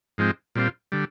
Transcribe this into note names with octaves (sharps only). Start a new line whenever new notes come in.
G#2 F3 G#3 C4
A#2 G3 C4 F4
D3 G3